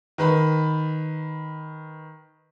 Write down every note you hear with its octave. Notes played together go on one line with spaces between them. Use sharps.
D#3 B4 B5